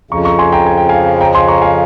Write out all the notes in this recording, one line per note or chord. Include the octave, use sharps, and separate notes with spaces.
F2 C#3 F3 A#5 C#6
A#5 C#6
G#5 C6
G5 A#5
G#5
G5
F5 G#5
G5 A#5
G#5 C6
A#5 C#6
F5 G#5